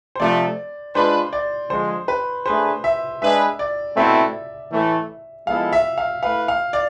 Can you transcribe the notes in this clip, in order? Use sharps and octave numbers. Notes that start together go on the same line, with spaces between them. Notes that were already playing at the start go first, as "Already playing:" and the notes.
C5
C3 F3 A3 D5
G#3 D4 F4 B4 C5
D5
D3 F3 G#3 C5
B4
A3 D4 G#4 B4 C5
E5
G#3 D4 G#4 B4 E5
D5
B2 A3 C4 E4 B4 E5
A2 E3 A3
F3 G#3 B3 E4 A4 F5
E5
F5
A3 E4 B4 F5
F5
D5